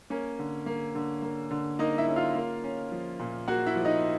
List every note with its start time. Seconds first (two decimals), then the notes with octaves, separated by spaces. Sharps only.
0.10 A#3 C#4 C#5
0.39 D3
0.66 A#3
0.95 D3
1.22 A#3
1.51 D3
1.79 A#3 D#4 D#5
1.98 E4 E5
2.08 C#4
2.16 F4 F5
2.35 A#3
2.64 C#4
2.92 F3
3.19 A#2
3.48 A#3 F#4 F#5
3.66 E4 E5
3.76 F3
3.85 D#4 D#5